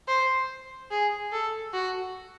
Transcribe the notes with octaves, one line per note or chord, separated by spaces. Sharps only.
C5
G#4
A4
F#4